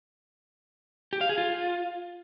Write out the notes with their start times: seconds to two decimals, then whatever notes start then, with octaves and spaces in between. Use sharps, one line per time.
1.13 G4
1.21 F5
1.29 G#4
1.38 F4